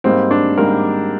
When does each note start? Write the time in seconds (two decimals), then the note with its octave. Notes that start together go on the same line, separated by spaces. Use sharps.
0.04 G#2 G3 A#3 C4
0.31 D4
0.57 G#2 G3 A#3 A#4